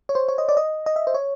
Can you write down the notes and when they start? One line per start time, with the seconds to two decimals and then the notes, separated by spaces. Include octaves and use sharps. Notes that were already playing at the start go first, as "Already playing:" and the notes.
0.09 C#5
0.15 C5
0.28 C#5
0.38 D#5
0.49 D5
0.57 D#5
0.86 D#5
0.96 E5
1.07 C5
1.14 C#5